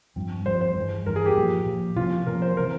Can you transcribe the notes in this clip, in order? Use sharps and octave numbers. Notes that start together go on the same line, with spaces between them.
G2 F3 C4
G2 F3 C4 C5
C5
G2 E3 G#3
G2 E3 G#3 A#4
G#4
G4
A#2 F3 A#3
A#2 F3 A#3
C3 F3 A#3 C#4 F4
C3 F3 A#3 C#4 A#4
C5
C3 E3 A#4